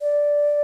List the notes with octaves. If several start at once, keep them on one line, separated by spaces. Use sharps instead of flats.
D5